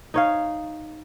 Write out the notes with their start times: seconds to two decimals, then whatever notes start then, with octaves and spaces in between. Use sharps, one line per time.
0.14 D#4 C#5 F5